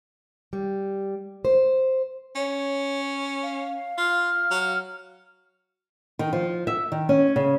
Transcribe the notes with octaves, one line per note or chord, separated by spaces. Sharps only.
G3
C5
C#4 C#5
F5
F4 F6
F#3
D#3
F3
E5
D#3
C#4
C#3